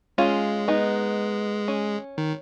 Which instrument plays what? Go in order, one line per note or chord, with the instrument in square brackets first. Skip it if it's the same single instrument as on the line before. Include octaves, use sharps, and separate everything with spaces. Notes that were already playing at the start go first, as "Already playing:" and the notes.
[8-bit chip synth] G#3 [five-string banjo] C#4 F4
[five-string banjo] B3 D#4
C#4
[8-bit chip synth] D#3